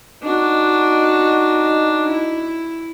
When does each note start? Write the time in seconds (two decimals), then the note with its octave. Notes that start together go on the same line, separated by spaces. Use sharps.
0.23 D4 D#4 F#4
2.09 E4